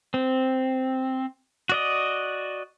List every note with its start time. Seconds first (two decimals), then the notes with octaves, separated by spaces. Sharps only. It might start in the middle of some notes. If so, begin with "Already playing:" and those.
0.14 C4
1.69 F#4 D5 D#5